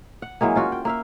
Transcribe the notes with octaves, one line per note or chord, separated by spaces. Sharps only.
F#5
E3 F#3 G#3 A#3
C#4 F4 F#4
G5
A#3 E5 F5